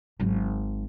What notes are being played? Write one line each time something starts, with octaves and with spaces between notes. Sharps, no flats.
G#1 F#3